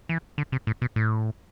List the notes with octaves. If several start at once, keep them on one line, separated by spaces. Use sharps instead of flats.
E3
D3
C3
A2
B2
A2